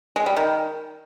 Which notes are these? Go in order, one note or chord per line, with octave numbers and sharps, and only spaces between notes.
G#3
G3
D#3